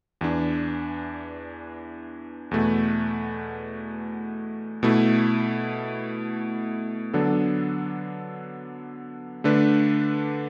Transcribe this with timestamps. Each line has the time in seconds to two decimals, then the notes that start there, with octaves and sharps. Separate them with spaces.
0.21 E2 E3 D4
2.51 E2 B2 A3 F#4
4.83 B2 A3 E4
7.13 D3 F#3 B3 D4 A4
9.44 D3 A3 D4 B4